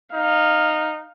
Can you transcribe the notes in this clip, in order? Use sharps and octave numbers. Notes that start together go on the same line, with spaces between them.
D#4 F5